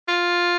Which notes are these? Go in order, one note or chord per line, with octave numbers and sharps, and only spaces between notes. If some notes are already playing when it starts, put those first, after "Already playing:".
F4